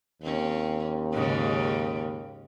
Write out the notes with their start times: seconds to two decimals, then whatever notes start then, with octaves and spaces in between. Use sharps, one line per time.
0.22 D#2 C4 C#4
1.12 G#2 C#3